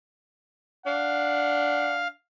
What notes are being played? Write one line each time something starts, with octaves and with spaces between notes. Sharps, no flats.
D4 F5 F#5